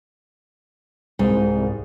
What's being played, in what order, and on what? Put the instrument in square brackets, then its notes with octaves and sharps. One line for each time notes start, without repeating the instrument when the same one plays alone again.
[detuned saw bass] C2 [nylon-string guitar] G#2